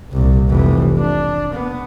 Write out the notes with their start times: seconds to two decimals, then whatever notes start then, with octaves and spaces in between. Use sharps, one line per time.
0.12 C2 A#2
0.49 F1 E3
0.99 D4
1.54 B3